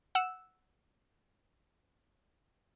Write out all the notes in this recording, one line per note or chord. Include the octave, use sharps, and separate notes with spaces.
F#5 E6 E7